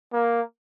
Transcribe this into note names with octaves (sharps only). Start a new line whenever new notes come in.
A#3